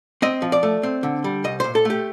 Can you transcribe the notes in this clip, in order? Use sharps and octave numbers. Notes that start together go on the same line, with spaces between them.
C4 D#5
F3
D5
A3
C4
D3
G3
C2 D#5
A#2 C5
A4
A3 G4